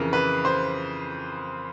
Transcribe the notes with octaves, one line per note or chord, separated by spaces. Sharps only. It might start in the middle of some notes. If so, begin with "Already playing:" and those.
Already playing: F2 C#3 E3 A#4
B4
C5